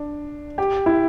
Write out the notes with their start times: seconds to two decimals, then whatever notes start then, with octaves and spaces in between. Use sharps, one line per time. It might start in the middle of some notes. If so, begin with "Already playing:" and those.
Already playing: D4
0.58 G4
0.86 E4